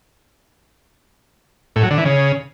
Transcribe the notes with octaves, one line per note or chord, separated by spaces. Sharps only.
A2
F#3
D3
E3
C#3